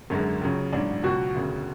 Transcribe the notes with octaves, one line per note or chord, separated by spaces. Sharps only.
G#1 F#2 D3 G#3
C#2 C#3 F#3
A1 G#2 F#3 D4
C#2 B2 F#3 F#4
E1 D2 C#3